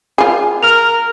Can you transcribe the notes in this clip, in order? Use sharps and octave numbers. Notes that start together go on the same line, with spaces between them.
F4 G#4
A#4 F6 F7